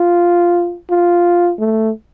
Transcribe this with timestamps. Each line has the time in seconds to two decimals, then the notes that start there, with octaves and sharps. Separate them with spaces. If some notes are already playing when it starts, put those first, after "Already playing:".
Already playing: F4
0.90 F4
1.59 A3